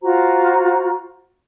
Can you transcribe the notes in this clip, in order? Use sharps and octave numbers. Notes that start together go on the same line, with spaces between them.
F4 F#4 C5 A#5